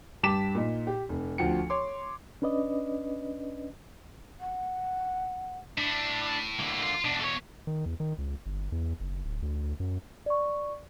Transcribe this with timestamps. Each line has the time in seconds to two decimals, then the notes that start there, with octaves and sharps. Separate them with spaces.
0.23 G2 G4 A5 D6 B6 E7
0.55 A#2 D#4
0.87 G4
1.09 F1
1.38 D2 F3 F#4 G5 C#7
1.70 C#5 C6 D6
2.42 C#4 D4 B4 D5 D#5
4.40 F#5
5.78 A2 D4
6.59 D3 A#3
6.83 F4
7.05 E2 B2 D4
7.20 A4 C#5
7.67 D#3
7.86 E2
8.00 D#3
8.18 C#2
8.46 G1
8.72 E2
9.00 F#1
9.24 D1
9.42 D2
9.80 F#2
10.26 D5 C#6